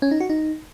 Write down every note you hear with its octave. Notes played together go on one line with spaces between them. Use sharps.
C#4
D#4
F#4
D#4